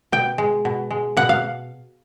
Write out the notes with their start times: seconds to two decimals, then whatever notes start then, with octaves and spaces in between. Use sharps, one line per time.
0.12 B2 G5
0.38 G#3
0.65 B2
0.90 G#3
1.17 B2 F#5
1.29 F5